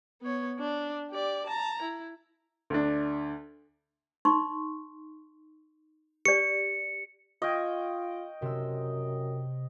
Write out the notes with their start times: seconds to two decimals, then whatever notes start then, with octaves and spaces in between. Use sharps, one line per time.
0.22 B3 C#5
0.59 D4
1.11 G4 D5
1.47 A5 A#5
1.82 E4
2.70 D2 D4
4.25 D#4 C6 C#6
6.25 G4 D5 C#7
7.42 F4 D#5 G5 C#6 F6 G#6
8.42 F#2 C3 E6